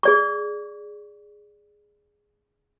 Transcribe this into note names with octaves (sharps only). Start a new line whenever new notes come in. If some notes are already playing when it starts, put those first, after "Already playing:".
G#4 D5 C#6